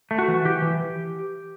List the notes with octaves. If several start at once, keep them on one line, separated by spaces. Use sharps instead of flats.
A3
F#4
E3
E3 G4
E3